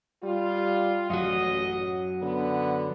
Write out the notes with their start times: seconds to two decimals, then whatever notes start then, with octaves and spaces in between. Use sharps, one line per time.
0.23 G3 F4
1.10 A1 F#2 F#3 D#5
2.22 D3 B3